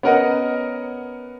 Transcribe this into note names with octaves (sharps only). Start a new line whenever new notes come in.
B3 C#4 A#4 D#5 F#5 A#5